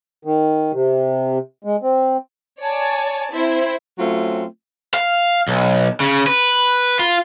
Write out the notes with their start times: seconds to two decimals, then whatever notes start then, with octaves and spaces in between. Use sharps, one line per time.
0.25 D#3
0.73 C3
1.64 G#3
1.83 C4
2.60 C#5 D5 G#5 A5
3.32 C4 E4 C5
3.99 F#3 A3 C4 C#4 F4
4.94 F5
5.48 B1
6.00 C#3
6.27 B4
6.99 F4